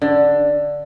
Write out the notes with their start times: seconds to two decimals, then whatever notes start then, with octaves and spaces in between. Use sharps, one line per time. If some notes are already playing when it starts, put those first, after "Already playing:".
0.02 D3